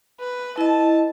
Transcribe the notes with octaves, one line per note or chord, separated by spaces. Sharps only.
B4
E4 D#5 A5